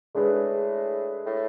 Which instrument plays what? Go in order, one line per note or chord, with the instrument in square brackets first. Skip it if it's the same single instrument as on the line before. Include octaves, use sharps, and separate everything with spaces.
[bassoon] A2 [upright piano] G#3 D4 G#4 B4
[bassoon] A2